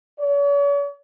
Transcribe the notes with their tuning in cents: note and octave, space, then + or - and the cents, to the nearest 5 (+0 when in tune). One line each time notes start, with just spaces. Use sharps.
C#5 +45